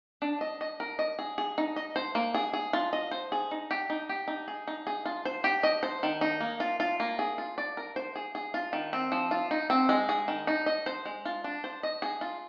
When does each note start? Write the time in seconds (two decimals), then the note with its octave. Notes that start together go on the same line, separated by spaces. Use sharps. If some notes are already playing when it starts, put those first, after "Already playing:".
0.22 D4
0.41 D#5
0.61 D#5
0.80 A#4
0.99 D#5
1.19 G#4
1.38 G#4
1.58 D#4
1.76 D#5
1.96 C5
2.15 A#3
2.34 G#4
2.53 G#4
2.73 F4
2.93 D#5
3.11 C5
3.32 G#4
3.51 D#4
3.71 G4
3.90 D#4
4.09 G4
4.28 D#4
4.48 G#4
4.67 D#4
4.87 G#4
5.05 F4
5.25 C5
5.44 G4
5.63 D#5
5.83 C5
6.03 D#3
6.21 D#4
6.40 A#3
6.60 F4
6.80 F4
7.00 A#3
7.19 G#4
7.38 F4
7.58 D5
7.77 A#4
7.96 C5
8.15 G#4
8.35 G#4
8.54 F4
8.73 D#3
8.93 C4
9.12 F3
9.31 F4
9.51 D#4
9.70 C4
9.89 G#3
10.09 G#4
10.28 D#3
10.47 D#4
10.66 D#5
10.86 C5
11.05 G#3
11.25 F4
11.44 D4
11.64 C5
11.83 D#5
12.02 G#4
12.21 F4